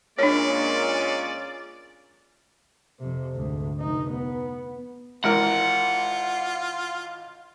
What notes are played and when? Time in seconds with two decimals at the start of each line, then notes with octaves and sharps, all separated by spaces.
0.19 A#2 G#3 C#4 D4 C#5 D5
3.00 F2 C3
3.35 D2 G#2
3.80 F1 D#4
4.11 B3
5.24 G#1 E3 G#3 F4 A#4 F#5